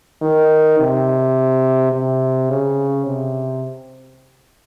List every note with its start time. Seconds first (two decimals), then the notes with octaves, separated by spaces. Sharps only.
0.22 D#3
0.79 C3
1.92 C3
2.50 C#3
3.06 C3